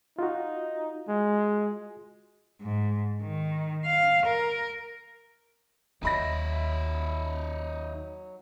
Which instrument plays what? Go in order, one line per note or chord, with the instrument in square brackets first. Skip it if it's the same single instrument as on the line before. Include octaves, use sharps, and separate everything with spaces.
[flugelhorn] D#4 [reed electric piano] F4 F#4
[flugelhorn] G#3
[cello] G#2
D#3
F5
A#4
[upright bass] D#2 [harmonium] F#3 [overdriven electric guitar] D#4 E5 [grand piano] D#5 B5 A#6